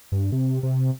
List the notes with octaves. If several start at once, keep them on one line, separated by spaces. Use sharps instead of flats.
G2
C3
C3